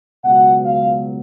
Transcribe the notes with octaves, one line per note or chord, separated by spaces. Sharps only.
C#2 B2 F#3 F#5
F5